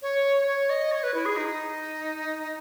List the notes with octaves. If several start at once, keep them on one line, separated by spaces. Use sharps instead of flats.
C#5
C#5
D#5
C#5
B4
E4
G#4
D#4